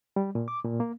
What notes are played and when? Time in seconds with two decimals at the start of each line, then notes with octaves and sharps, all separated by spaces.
0.16 G3
0.35 A#2
0.48 D6
0.64 A#2
0.80 A#3